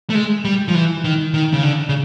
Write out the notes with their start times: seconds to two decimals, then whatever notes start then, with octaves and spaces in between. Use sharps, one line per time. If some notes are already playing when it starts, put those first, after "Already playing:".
0.10 A3
0.15 G#3
0.45 G3
0.68 F3
0.75 E3
1.04 D#3
1.34 D#3
1.53 C#3
1.63 D3
1.89 C#3